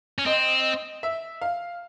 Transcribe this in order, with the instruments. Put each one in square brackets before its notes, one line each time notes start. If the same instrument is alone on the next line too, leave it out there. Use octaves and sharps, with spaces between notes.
[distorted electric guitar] C#4
[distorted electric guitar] C4 [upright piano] D#5
[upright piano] E5
F5